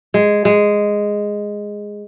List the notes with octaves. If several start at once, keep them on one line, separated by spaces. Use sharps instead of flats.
G#3
G#3